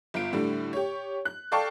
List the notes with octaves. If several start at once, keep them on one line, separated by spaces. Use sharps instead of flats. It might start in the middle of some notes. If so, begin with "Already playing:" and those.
G1 F4 D7
A2 D3 G3
G4 C#5
F#6
A4 D5 F5 G5 A5 C#6